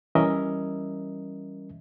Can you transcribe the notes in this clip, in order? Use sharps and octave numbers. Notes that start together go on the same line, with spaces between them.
E3 G3 C#4 A#4 D#5 E5